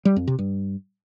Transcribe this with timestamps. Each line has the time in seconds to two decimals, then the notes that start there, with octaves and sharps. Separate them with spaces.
0.05 G3
0.16 F2
0.28 C3
0.39 G2